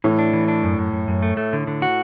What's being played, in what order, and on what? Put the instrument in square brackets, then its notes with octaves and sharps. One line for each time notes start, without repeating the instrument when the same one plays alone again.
[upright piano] A2 [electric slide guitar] E3
[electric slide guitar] D4
E3
D4
F#2
F#2
F#2
F#2
A3
A3
D3
D3
F#4